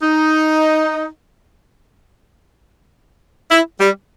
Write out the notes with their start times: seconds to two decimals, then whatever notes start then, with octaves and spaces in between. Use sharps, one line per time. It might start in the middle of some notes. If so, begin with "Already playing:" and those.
0.03 D#4
3.51 E4
3.81 G3